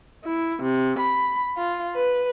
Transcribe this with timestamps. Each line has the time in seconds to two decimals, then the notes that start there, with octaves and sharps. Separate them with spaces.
0.23 E4
0.62 C3
0.99 B5
1.55 F4
1.95 B4